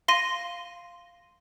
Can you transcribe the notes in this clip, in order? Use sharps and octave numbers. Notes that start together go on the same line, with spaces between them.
F5 C6 A#6 D#7